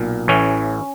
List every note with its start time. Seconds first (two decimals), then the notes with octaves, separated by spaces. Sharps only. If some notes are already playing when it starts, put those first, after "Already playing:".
Already playing: B1 A#2
0.28 A1 A2 E3 C#4